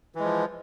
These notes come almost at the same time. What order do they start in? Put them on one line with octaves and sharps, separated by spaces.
E3 G#3 F3